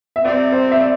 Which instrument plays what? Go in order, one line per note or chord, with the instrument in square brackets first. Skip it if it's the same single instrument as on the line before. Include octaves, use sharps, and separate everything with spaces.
[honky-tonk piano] E5
[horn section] C3 G3 C4 [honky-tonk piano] D5
[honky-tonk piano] C5
E5
D5